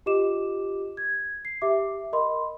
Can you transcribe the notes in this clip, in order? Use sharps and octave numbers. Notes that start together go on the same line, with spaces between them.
F4 G4 D#5 D6 E7
G#6
C7
G4 E5 D6
A#4 D#5 B5 C6